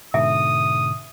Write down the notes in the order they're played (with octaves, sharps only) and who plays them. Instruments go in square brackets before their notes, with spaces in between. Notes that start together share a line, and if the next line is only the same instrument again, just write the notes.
[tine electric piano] G#2 B2 D3 [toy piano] E5 [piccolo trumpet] D#6